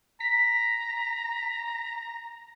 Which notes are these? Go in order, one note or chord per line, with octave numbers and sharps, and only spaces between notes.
A#5 B6